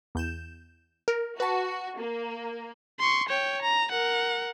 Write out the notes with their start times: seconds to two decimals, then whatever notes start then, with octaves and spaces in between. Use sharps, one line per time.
0.15 E2 G6 E7
1.08 A#4
1.40 F#4 B4 A5
1.98 A#3
2.99 C6 C#6
3.29 C#5 G5
3.62 A#5
3.91 A#4 F#5